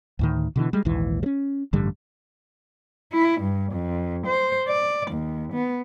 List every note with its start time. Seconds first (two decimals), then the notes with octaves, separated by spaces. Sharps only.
0.19 D2 A2 D#3
0.56 B2 D3 E3
0.73 G3 G#3
0.85 A#1 D#2 G#2 E3
1.23 G3 C#4
1.73 A1 G2 D3 G3
3.12 E4
3.41 G2
3.72 F2
4.27 C5
4.68 D5
5.11 D#2
5.53 B3